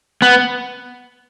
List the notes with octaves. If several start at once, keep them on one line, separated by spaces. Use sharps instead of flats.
B3